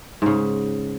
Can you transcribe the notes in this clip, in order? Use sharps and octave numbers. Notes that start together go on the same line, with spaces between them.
G#2 C#3